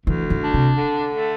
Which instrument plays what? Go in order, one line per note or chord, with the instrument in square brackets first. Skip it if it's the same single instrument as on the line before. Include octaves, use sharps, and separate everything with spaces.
[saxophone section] D2 [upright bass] E3
[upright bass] E3
[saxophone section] D4
[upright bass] C3
[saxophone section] D3
A3